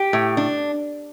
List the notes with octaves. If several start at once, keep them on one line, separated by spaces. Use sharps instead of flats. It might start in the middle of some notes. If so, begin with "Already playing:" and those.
Already playing: G4
A2
D4